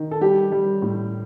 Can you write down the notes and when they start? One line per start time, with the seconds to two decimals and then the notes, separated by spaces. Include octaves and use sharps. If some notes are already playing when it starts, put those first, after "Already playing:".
Already playing: D#3
0.11 A4
0.21 G3 G4
0.52 G3
0.82 A2